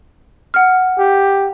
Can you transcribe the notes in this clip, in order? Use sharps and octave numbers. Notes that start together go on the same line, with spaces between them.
F#5 F6
G4